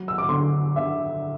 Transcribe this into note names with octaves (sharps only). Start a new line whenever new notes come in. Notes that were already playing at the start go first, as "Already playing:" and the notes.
Already playing: F#3
E6
D6
D2 C6
D3 E5